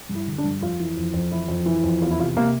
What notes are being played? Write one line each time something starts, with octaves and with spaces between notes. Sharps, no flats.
G2
E4
D3
D4
G2
F2 F4
E3
F2
F2
E3 E4
F2
E3
F2
E2 F4
E4
C3 F4
C3 A#3